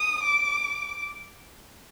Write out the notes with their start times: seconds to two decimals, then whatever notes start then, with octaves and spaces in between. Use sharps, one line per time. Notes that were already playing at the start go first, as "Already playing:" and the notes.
Already playing: D#6
0.24 D6